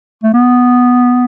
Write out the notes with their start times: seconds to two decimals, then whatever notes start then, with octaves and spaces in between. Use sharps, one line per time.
0.23 A3
0.34 B3